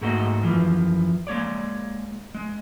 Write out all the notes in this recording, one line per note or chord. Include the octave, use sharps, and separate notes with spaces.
G#2 A3 A#3 F#4 G4 D#5
F#2 E3 F3
G#3 A#3 C#5 D5
G#3